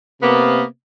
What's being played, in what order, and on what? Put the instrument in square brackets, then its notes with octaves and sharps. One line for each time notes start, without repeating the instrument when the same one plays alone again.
[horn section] C3 A#3 B3